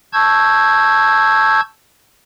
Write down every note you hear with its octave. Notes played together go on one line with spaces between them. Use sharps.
A5 C#6 E6 G6 G#6